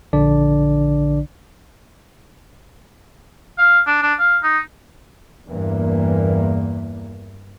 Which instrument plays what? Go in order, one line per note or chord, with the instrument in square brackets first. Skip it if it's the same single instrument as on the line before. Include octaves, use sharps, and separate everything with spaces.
[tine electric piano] A#1 D3 D4 D5
[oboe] F5
D4
D4
F5
D#4
[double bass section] E2 G2 E3 A#3